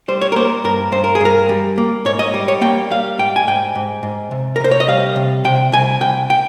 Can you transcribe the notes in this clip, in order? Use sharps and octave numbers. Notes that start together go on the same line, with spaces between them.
G3 C5
C#5
A#4
A#3 C5
G2 A#4
G2 C5
A#4
G#4
G2 A#4
G3
A#3
G#2 C#5
D#5
G3
C#5
A#3 G5
G3 F5
G#2 G5
G#5
G#2 G5
G#2
G#2
C3
A#4
C3 C5
C#5
D#5
G3 F5
C3
C3 G5
C2 G#5
C2 G5
G5